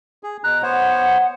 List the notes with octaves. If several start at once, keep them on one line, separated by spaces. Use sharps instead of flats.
G#4
B2 A#5 F#6
B3 C5 C#5 F#5